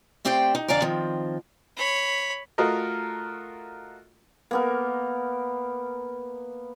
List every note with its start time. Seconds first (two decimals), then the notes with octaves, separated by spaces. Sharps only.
0.25 A3 C4 G4 C5 D5 G5
0.55 D#4
0.68 F2 D3 D5 F5 G#5 A#5
0.82 D#3 F3 C4
1.77 C#5 B5
2.58 A3 F4 F#4 A4 A#4 D#5
4.51 A#3 B3 A#4